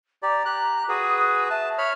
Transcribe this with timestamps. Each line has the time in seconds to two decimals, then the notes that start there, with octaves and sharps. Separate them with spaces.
0.23 G4 D5 A#5
0.45 G4 F#6
0.89 F#4 G#4 B4 D#6
1.50 E5 A5
1.78 C#5 B5 F6